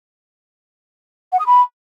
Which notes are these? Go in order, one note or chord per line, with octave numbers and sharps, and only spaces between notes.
F#5
D#6
B5